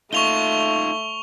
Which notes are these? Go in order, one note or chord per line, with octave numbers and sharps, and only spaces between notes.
A3 D#4 F4 C#6 F7 G7